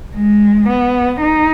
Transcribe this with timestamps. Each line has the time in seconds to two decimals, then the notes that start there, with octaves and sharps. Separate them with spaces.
0.16 G#3
0.69 B3
1.22 D#4